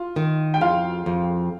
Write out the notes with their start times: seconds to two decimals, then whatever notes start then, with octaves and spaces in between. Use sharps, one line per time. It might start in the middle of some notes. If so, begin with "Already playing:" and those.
Already playing: F4
0.16 D#3
0.54 G5
0.61 F2 F4 F5
1.06 F2